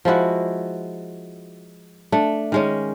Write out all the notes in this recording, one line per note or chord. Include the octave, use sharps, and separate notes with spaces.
F3 G#3 E4 F#4
A3 D4
D#3 G#3 C#4